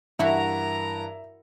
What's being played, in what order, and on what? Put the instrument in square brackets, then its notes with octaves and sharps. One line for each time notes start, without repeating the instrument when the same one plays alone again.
[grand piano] G2 E3 [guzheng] E4 F#4 [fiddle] A#4 A#5 [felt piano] E5